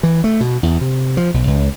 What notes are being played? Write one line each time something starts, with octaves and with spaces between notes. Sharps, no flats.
E3
A3
B2
E2
C3
F3
B1
C#2